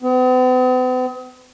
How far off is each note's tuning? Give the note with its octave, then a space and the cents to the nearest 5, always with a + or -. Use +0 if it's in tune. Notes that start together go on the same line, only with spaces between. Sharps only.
B3 +45